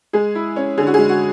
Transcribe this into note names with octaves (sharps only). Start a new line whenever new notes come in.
G#3 G#4
E4
C#4
D3 G#4
F#4
G#4
G#3
F#4